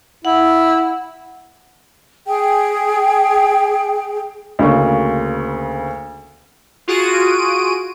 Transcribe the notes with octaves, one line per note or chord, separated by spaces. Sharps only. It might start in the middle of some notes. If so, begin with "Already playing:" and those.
E4 F#5
G#4 G5
D2 C#3 A#3 C#6
F4 F#4 G#4 D7 D#7